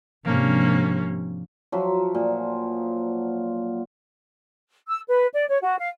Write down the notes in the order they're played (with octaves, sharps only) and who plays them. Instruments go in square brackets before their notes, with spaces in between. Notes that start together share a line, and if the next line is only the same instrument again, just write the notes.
[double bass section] G#2 C3 [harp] F3 D4 [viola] A#3 C#4
[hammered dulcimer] F3 F#3 E5
A#2
[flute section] E6
B4
D5
C#5
F#4
F5